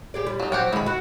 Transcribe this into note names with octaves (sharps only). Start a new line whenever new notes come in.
G4 G#4 D5
G3
F#3 D#4
F#3 C4 G4 F#5 G5
D#3 G#3 E4 B5
F#4